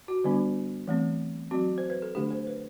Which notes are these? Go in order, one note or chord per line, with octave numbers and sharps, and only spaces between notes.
F#4
D3 G3 B3 D4
E3 A3 C4
F#3 C4 F#4
C5
B4
A4
D3 A3 D4 G4
C5
B4